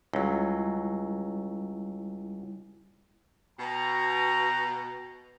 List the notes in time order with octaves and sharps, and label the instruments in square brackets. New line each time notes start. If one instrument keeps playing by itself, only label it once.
[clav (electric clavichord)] C#2 F#3 [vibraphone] G3 E4
[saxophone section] B2 [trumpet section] G5 A#5